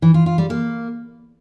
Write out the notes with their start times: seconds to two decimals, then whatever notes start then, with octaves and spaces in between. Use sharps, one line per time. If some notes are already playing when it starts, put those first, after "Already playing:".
0.02 E3
0.14 F4
0.26 F4
0.38 G3
0.50 A#3